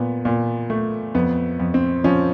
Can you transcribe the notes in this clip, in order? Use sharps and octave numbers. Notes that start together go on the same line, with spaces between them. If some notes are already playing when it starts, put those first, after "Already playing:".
Already playing: A#2 B3
A#2
A3
F2 B3
F2
C4
F3 C#4